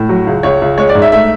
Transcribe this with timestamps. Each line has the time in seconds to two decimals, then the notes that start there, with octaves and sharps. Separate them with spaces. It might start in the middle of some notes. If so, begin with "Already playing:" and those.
Already playing: A2
0.09 F#3
0.27 C#2
0.43 C#2 C#5
0.62 C#2
0.78 G#3 C#5
0.89 D5
0.95 G#2
1.02 E5
1.12 A3 E5